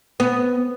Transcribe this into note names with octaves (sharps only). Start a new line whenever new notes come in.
B3